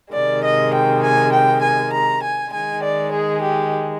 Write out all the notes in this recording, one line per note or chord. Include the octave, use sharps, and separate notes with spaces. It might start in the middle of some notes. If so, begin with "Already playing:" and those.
C3 D#3 G#3 D5
D#5
G5
G#5
G5
G#5
A#5
G#5
D#3 G#3 G#5
D5
G#4
G4